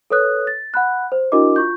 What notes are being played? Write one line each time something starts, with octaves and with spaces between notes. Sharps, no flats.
A4 B4 C#5 D#6 F#6
A6
F#5 B5 F#6
C5
D4 E4 F#4 A#4 D#5 D6
F4 C#6 G6